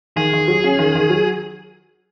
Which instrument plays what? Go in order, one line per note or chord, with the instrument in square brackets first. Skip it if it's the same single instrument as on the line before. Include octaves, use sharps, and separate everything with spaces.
[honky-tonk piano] D#3 [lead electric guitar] G#4
[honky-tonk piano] D#3
F#3
C#4
D#3
D#3
F#3